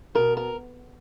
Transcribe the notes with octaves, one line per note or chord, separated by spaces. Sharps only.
B2 A#4
A#4